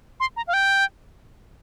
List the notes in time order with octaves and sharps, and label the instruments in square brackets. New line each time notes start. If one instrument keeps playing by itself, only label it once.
[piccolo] C6
A#5
F5
G5